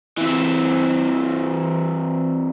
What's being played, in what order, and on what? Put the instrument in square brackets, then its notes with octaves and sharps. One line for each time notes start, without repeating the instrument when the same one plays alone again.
[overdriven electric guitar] E3 C4